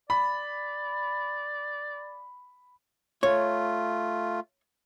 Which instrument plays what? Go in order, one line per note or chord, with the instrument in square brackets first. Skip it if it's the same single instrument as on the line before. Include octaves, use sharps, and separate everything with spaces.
[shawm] D5 [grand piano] B5
[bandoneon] A3 F4 [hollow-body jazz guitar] C#5